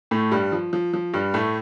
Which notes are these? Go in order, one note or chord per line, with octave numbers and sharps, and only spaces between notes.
A2 A3
G2 G3
F3
F3
F3
G2 G3
A2 A3